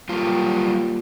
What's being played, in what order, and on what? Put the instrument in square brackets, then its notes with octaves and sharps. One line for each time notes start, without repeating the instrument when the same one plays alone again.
[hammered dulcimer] A#2 G4 [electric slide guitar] F#3 G3 F4